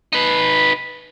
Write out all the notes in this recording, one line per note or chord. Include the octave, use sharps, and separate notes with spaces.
D#4 B4